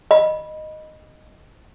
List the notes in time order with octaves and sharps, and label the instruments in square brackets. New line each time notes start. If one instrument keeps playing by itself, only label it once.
[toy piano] D#5 B5